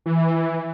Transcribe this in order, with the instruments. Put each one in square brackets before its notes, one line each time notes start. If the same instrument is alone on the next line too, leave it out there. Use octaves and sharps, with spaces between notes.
[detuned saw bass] E3